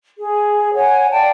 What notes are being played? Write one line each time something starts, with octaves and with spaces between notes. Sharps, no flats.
G#4
C#5 F#5 G#5
D5 F5 G5 A5